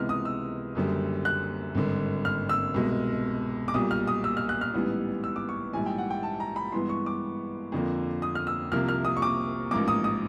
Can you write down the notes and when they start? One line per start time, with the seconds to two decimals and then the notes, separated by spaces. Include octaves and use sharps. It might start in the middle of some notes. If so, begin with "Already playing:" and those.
Already playing: C#2 C3 E3 G#3 B3 F6
0.09 D#6
0.25 E6
0.75 F#1 F#2 D3 G3
1.25 F#6
1.75 G#1 G2 D3
2.25 F6
2.49 E6
2.74 C2 B2 G#3
3.68 D6
3.74 B1 A#2 G3 D#6
3.91 F6
4.07 D#6
4.24 E6
4.37 F6
4.49 F#6
4.61 F6
4.74 A1 G#2 E3 G3 B3
5.24 E6
5.36 D6
5.49 C#6
5.73 A#1 G#2 E3 G3 G#5
5.86 G5
5.98 F#5
6.10 G5
6.23 A5
6.40 A#5
6.56 B5
6.72 G2 E3 G#3 B3 C6
6.89 C#6
7.06 D6
7.72 F2 D3 F3 A#3
8.22 D#6
8.35 F6
8.47 E6
8.72 C2 C3 F3 A#3 F6
8.88 F6
9.05 D#6
9.17 C#6
9.22 D6
9.71 A1 G#2 F3 A#3 D6
9.88 D#6
10.04 D#6